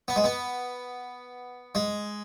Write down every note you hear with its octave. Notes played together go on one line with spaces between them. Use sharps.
B3
G#3
B3
G#3